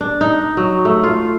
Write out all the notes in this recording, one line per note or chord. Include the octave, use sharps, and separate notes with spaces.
D4
D#4
F#3
A3
F4